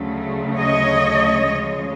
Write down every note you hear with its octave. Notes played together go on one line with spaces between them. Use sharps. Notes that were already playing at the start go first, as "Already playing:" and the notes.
Already playing: D2 C#3 F#3 A3
C#5 D#5
D2 C#3 F3 G#3